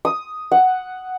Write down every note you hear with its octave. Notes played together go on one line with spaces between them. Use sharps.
D#6
F#5